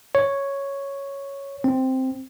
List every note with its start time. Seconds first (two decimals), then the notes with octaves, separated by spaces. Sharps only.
0.15 C#5
1.64 C4